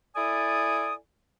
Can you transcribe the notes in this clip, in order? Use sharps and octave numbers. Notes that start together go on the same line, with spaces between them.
E4 A4 D5 G#5 D#6